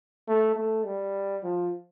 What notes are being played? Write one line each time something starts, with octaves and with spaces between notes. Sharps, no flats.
A3
A3
G3
F3